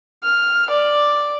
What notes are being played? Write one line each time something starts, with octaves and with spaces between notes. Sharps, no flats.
F6
D5